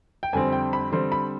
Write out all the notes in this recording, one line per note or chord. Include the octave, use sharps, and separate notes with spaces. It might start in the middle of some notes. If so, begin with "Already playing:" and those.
G5
F2 D3 G3 C4 G#5
G5
B5
D3 G3 C4 C6
B5